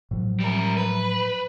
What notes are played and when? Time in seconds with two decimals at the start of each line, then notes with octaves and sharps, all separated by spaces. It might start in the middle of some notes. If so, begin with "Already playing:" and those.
0.11 A2 F3 F#3
0.40 G3 A#4
0.77 B4